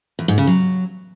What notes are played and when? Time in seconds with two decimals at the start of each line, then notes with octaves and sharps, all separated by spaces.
0.19 E2
0.28 G#2
0.38 C#3
0.47 F#3